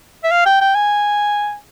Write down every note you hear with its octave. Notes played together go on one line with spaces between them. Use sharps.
E5
F5
G5
G5
G#5